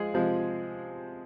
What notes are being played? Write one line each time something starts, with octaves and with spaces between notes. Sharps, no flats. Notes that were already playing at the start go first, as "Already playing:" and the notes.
Already playing: F3 G#3 F4 G#4
C3 F3 G#3